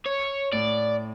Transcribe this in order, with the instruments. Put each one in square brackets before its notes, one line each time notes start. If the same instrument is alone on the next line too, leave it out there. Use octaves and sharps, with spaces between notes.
[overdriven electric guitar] C#5
[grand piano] A2 [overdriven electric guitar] D5